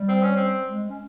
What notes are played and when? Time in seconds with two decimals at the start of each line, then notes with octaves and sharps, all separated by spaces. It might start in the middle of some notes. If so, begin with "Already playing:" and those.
Already playing: G3
0.08 C4
0.23 C#4
0.36 C4
0.68 G#3
0.89 C#4